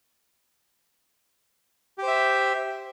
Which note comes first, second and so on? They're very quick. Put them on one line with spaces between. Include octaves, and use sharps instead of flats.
G4 C5 E5